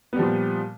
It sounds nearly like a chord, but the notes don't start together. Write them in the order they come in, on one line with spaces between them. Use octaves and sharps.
B3 G3 F3 A#2